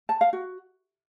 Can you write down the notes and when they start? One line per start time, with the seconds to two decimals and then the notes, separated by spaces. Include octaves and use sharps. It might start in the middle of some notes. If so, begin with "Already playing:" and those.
0.09 A5
0.21 F5
0.33 F#4